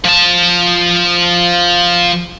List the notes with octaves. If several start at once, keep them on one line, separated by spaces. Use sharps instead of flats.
F3 A5